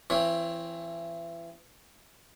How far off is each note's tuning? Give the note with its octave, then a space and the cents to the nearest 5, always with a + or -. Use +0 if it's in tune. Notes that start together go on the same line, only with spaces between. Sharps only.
E3 +30 C4 +5 C#5 -5